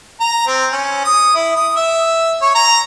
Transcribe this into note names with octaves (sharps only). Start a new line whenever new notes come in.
A#5
C4
C#4
D#6
E4
D#6
E5
C#5
A#5